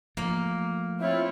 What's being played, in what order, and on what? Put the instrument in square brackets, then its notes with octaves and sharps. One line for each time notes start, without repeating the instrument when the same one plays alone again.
[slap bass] F3 A3 [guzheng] A#3
[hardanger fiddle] C4 C#5 [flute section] E4 F4 E5